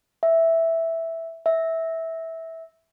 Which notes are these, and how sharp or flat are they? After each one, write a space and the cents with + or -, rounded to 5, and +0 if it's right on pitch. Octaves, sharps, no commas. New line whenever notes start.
E5 -5
E5 -15